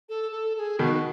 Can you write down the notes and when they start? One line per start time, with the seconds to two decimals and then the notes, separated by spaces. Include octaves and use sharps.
0.09 A4
0.32 A4
0.56 A4
0.59 G#4
0.79 B2 D#3 F#4